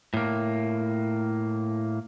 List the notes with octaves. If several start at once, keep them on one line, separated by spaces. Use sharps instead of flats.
A2 A#3